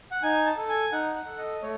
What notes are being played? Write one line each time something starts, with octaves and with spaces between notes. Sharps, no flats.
F#5
D#4 G#5
A5
A4
G#5
D#4 F#5
F#5
A4
D#5
A3 C#5